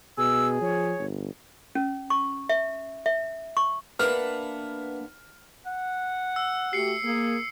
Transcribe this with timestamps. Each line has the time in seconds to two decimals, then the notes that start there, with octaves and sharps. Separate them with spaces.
0.18 B2 G#4 E6
0.61 F3 C#5
0.98 G1
1.75 C#4
2.10 C#6
2.49 E5
3.06 E5
3.57 C#6
3.99 A#3 B3 D4 B4 E5 F#5 F6
5.67 F#5
6.36 E6
6.73 A3 F#4 G4 C7 C#7
7.04 A#3 G#4